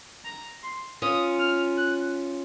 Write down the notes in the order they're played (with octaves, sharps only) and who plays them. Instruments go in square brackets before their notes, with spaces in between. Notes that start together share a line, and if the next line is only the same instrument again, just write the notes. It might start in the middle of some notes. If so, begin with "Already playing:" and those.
[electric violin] A#5
C6
[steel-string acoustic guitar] C#4 F4 [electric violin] D#6
[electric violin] F6
F#6